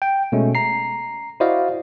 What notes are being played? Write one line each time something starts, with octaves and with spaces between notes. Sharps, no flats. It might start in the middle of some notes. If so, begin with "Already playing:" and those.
G5
B2 G#3 A3 C#4
A#5 C7
E4 F#4 C5 D5 D#5 F5